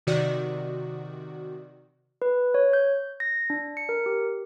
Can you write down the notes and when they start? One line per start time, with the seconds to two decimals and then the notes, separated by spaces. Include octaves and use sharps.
0.07 C3 D#3 F#4 D5
2.22 B4
2.54 C#5
2.73 G6
3.20 A#6
3.50 D4
3.77 C#7
3.89 A#4
4.06 G4